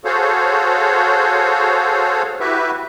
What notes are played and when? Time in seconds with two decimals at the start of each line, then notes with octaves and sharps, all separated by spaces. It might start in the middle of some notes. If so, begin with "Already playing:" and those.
0.05 F#4 G#4 A4 C5 C#5 F5
2.40 E4 F#4 G4 B4 E5